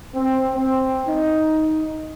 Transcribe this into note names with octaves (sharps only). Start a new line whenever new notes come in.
C4
C4
D#4